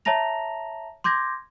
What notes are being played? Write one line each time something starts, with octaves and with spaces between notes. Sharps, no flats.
C#5 E5 A5 A#5 A#6 F7
C6 D6 G6 G#6 A#6